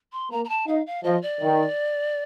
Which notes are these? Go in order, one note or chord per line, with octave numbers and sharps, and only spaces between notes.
C6
A#3 A#5
A#5
A5
D#4 F5
F5
F3 D#5
D5
D#3